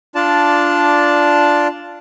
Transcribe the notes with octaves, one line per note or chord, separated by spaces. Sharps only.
D4 F4 D5 A5